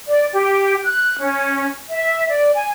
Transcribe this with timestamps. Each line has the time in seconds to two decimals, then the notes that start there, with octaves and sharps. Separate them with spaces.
0.08 D5
0.33 G4
0.83 F#6
1.20 C#4
1.89 E5
2.28 D5
2.55 G#5